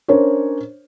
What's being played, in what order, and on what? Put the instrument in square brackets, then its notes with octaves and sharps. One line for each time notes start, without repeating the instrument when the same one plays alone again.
[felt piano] C#4 D4 A#4 C5 C#5